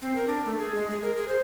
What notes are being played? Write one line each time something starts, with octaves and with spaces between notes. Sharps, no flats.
C4
A#4
D4
A3
G#4
G#3
G#4
A#4
G#4
C5